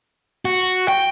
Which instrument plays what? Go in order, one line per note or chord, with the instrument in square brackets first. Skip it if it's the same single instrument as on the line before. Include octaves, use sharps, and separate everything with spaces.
[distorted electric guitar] F#4
G5